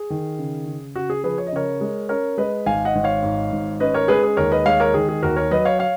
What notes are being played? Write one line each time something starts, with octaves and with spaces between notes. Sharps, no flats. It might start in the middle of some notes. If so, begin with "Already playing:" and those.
Already playing: G#4
D#3
C#3
C#3
C#3 F#4
G#4
F3 G#4 B4
C#5
D#5
C#3 A#4 C#5
G#3
C#4 A#4 C#5
G#3 B4 D#5
G#1 F5 G#5
D#5 F#5
G#1
C#5 F5
G#2
G#1
C#4 B4 D#5
A#4 C#5
G#3 G#4 B4
G#4
D#2 A#4 C#5
B4 D#5
G#3 C#5 F5
A#4 C#5
D#3 G#4
G#4
D#2 F#4 A#4
A#4 C#5
F#3 B4 D#5
C#5 F5
C#5 F5